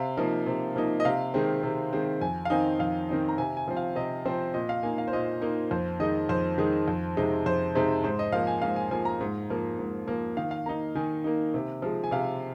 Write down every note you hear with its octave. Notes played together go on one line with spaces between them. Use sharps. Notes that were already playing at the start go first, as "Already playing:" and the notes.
Already playing: C3 F5
F3 A#3 D#4
C3
F3 A#3 D#4
D#5
C3 F5
D#3 G#3 C4
C3
D#3 G#3 C4
F2 G#5
F5
D#3 C4 D#4 G#5
F2 F5
D#3 C4 D#4
A#5
C3 G#5
G#5
F3 C4
F5
C3 D#5
F3 C4 C5
A#2 D#5
F5
A#3 D#4 G#5
F5
C5
A#2 D#5
A#3 D#4
F2 C5
D#3 G#3 D#4 D#5
F2 C5
D#3 G#3 D#4
F2
C3 G#3 D#4
F2 C5
C3 G#3 D#4
G#2 C5
D#5
F3 A#3 F5
G#5
G#2 F5
G#5
F3 A#3 G#5
A#5
G#2
F3 A#3
G#2
F3 A#3
D#3 F5
F5
A#3 D#4 A#5
D#3 G#5
A#3 D#4
C3
F3 G#3
G#5
C3 F5